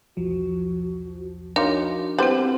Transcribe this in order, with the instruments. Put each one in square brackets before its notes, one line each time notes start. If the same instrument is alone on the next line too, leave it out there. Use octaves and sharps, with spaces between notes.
[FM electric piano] B1 E2 F3 [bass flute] F#4
[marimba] D4 A#4 C#5 [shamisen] D#4 F4 [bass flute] F#4
[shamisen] G3 B3 C5 [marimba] C4 E4